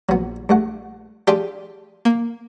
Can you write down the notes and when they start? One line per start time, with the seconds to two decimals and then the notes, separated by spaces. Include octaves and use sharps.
0.09 A#1 F#3 B3
0.49 G2 A3 F#5
1.27 D4 F4 G4 G#4
2.05 A#3